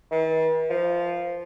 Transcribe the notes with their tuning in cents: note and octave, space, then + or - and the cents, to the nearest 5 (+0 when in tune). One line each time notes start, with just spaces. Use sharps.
E3 -45
F3 -5